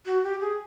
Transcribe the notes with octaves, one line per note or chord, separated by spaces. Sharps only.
F#4
G4
G#4